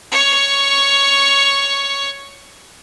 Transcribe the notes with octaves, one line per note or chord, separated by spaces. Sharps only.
C#5 C#6